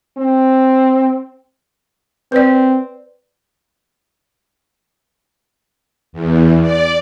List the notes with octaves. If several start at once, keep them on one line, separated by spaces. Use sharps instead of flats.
C4
C4 B4 D5
E2
D5